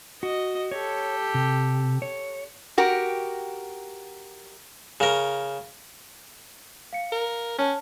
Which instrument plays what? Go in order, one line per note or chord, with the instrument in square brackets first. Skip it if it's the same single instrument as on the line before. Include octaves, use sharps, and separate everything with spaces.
[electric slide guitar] F#4 [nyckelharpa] D#5
[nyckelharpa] G4 A4 [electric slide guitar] C#5
[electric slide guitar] C3
C#5
[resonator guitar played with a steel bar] F#4 G4 A#4
[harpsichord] C#3 A#4
[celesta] F5 C#7
[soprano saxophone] A#4
[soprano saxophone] C#4 [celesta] C#5 A5 F6